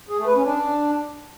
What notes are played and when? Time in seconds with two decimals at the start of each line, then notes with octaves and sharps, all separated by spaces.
0.09 G#4
0.18 A3
0.27 B4
0.35 C#4
0.44 D4